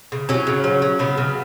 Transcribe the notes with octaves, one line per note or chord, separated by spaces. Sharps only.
C#3
F#3 C#4
C#3
F#3
F#3
C#3 B3
C#3